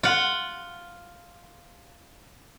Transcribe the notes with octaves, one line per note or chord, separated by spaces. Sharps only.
F4 F#5